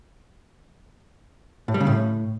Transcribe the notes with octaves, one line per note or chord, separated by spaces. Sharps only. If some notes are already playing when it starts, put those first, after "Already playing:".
A2
G3
C#3
A2